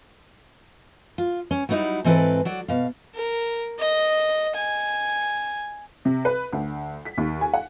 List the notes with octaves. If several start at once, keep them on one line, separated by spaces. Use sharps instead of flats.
F4
C#4
F#3 G3 B3 D#4 E4 F#4
G#2 E3 C4 A4 B4
F#3 F#4 D5
B2 F5
A#4
D#5
G#5
C3
B4
D2
B6
D#2
G#5
F#5